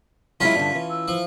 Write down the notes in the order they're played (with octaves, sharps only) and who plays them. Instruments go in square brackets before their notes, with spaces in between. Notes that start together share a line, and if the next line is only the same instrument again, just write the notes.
[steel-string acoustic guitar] F#3 G#3 E4 [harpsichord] C#4 F4 [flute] B6
[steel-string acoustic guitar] G2 D3
E3
[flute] E6
[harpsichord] F3